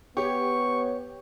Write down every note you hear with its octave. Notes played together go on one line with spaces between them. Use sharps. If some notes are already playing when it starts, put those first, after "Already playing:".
B3 G4 C#5 C#6